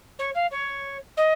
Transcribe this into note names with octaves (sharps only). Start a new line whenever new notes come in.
C#5
F5
C#5
D#5